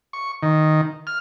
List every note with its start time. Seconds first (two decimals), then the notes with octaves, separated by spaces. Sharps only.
0.13 C#6
0.42 D#3
1.07 F6